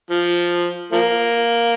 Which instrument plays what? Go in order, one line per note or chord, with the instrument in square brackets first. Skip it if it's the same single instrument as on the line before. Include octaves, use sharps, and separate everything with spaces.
[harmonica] F3
F3 A#3